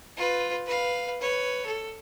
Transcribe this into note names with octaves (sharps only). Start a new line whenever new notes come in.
F4 B4
B4 F5
B4 C#5
A4